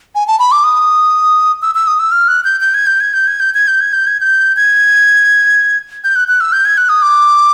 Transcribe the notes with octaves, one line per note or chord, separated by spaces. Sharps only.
G#5
A5
B5
D6
D#6
E6
E6
D#6
E6
F6
F#6
G6
G6
G#6
G6
G#6
G6
G#6
G6
G#6
G6
G#6
G6
G#6
G6
G#6
G6
F#6
F#6
E6
G6
G#6
F#6
D#6
D6